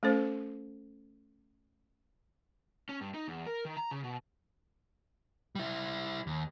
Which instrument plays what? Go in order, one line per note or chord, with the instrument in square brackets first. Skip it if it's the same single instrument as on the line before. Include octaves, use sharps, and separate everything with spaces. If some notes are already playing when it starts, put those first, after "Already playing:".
[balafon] A3 C#4 A4 C5
[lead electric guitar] C#4
G2
D#4
E2
A#4
D#3
A#5
C#3
B2
G3 E4
D#2